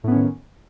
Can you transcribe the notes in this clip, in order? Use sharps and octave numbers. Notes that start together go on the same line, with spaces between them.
A2 D#3 B3 C#4